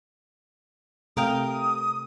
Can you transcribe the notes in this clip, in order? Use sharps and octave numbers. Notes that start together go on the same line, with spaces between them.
C3 A3 A#4 F5 G5 D#6